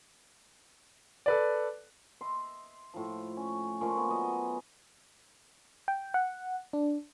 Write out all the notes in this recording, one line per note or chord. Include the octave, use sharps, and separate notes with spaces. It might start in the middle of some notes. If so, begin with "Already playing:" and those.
A4 B4 D5
D#5 E5 C6
A2 F3
C#4
F3 A#3 C#4 D5
B3
F#3 D#5
G5
F#5
D4